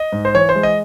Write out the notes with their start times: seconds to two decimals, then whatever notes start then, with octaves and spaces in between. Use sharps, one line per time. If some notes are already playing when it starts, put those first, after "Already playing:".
Already playing: D#5
0.12 G#2
0.25 C5
0.34 E3 C#5
0.49 C5
0.55 G#3
0.63 D#5